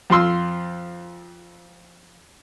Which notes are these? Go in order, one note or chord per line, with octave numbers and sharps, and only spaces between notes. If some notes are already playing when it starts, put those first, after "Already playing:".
F2 F4 C6 E6